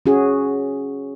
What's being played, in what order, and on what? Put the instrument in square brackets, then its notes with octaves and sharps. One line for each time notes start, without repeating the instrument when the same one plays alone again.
[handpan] C#4 F#4 G#4